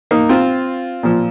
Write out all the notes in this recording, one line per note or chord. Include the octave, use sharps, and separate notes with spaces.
A#3 D#4
C4 F4
A#2 F3